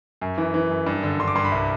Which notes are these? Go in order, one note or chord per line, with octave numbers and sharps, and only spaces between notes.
F#2
E3
E3
F#2
G2
D3
D3 C6
D6
G2 C6
B5
C2